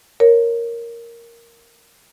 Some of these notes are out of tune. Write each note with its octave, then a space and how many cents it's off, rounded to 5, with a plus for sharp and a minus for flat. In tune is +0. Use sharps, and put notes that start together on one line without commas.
A#4 +0 C#5 +0